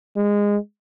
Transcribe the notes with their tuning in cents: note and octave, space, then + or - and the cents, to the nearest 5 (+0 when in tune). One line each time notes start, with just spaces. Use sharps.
G#3 -20